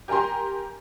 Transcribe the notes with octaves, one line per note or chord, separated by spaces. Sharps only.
G4 A#4 G#5 A#5 C6